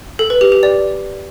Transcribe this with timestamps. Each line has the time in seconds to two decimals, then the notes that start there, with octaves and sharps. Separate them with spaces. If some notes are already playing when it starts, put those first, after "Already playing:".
0.19 A4
0.30 B4
0.41 G4
0.52 G4
0.63 D5